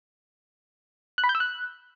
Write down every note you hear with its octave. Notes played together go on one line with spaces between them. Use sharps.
F#6
B5
G6
E6
F#6